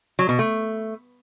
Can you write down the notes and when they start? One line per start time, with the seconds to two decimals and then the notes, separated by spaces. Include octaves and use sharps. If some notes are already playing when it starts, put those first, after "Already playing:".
0.19 F#3
0.29 B2
0.39 A3